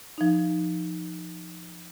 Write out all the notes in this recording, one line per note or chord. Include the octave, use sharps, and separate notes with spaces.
F3 D#4